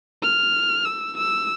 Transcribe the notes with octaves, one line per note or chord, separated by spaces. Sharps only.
F6
E6
E6